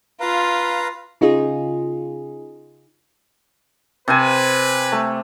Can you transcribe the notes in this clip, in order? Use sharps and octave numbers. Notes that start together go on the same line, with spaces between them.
F4 B4 F5 A#5
C#3 D#4 F4 G#4
C3 B4 C5 G#5
A3